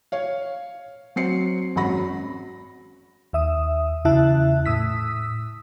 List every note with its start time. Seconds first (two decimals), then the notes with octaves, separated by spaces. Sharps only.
0.12 C#5 F5
1.16 F#3 C4 C7 C#7
1.76 G#1 F#2 F#4 B5 A#6
3.33 D#2 E5 D#6
4.05 E2 C#3 E4 E5 A5 F#6
4.66 A2 D#6 E6 B6